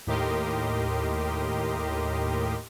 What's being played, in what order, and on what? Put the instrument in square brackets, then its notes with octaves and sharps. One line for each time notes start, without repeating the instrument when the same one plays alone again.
[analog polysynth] D#2 A2 G4 A#4 D#5 C6